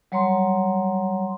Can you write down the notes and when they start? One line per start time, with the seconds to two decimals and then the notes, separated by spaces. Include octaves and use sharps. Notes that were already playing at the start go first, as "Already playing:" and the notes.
0.12 F#3 G3 C#5 A#5 C6